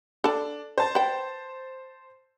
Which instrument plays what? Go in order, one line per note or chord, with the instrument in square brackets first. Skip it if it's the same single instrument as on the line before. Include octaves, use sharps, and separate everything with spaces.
[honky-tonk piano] D4 [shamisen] A4 A5
[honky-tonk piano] C5 A5
[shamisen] B4 G5